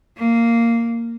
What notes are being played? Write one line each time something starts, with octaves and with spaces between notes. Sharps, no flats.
A#3